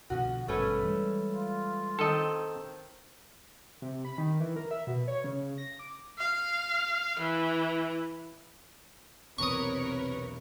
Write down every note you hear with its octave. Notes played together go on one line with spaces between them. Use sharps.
C2 B2 D3 F3 F#4
G#1 G2 B2 A3 C#4 B4
E3 G3 G#3
F4
D#3 C4 A4 D#5
C3
B5
D#3
E3
A#4
E5
B2
C#5
C#3
A#6
D6
F5
E3
B1 E2 C3 A#4 B4 C#5 C#6 D#6